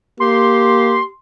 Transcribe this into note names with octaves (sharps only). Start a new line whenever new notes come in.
A#3 G4 C6